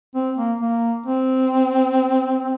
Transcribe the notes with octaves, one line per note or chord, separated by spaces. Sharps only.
C4
A#3
A#3
C4